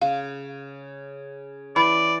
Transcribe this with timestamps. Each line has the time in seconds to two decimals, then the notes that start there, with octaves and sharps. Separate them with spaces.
0.02 C#3 F5
1.76 E3 D5 B5